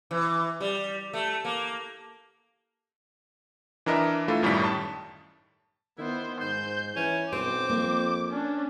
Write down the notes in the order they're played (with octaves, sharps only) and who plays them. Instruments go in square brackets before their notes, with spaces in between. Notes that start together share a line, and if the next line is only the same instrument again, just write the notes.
[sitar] E3
G3
A3
A#3
[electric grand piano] E3 D4 A#4 D#5 E5
A3 E4 F4 A4
G1 F#2 A2 D#3 G3 B6
A5
[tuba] D#3 [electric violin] B3 C5 [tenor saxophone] E4
[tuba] G#2 [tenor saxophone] C5 [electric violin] G6
[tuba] E3 [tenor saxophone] C#4
[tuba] B1 [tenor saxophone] C4 [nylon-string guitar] C5 [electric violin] D6
[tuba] F2 [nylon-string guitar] A#3
[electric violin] C#4 D4